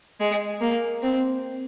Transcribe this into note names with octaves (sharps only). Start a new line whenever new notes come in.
G#3
A#3
C4